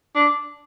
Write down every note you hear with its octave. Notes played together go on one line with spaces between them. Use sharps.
D4